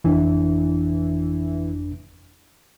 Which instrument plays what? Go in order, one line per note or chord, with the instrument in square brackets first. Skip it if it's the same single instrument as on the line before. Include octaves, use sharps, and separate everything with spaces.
[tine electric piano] G1 F2 D4 [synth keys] E3